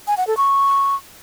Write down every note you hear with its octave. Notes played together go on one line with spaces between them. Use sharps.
G#5
F#5
A4
C#6